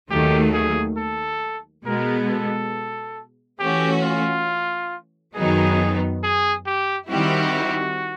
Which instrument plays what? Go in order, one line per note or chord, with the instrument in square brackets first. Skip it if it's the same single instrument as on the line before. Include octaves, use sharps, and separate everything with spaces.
[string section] D#2 D#3 F#3 A3 [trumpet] G4
[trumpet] G#4
A4
[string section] B2 G#3 B3 [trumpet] A#4
[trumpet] A4
[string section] E3 A3 C#4 F#4 [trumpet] G4
[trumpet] F4
[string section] F#2 D#3 F#3 B3 D#4 [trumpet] G#4
[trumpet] G#4
G4
[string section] D#3 G3 C4 E4 G4 [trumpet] F#4